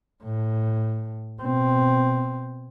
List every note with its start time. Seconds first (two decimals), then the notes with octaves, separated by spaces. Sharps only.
0.23 A2
1.42 B2 C4